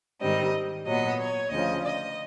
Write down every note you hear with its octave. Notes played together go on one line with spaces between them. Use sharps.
G#2 D#3 G3 C4 D#5
A#2 F#3 B3 D#5
C#5
D2 C#3 F3 D#5
D#5